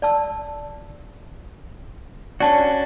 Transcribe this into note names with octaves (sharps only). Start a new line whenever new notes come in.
D5 A5 E6
C#4 D4 F#4 D5 A5